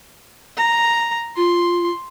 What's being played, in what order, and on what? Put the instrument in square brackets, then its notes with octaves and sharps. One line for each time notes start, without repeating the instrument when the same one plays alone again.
[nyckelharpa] A#5
[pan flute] F4 [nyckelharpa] C6